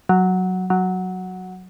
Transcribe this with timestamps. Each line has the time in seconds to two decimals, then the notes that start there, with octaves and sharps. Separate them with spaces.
0.09 F#3
0.70 F#3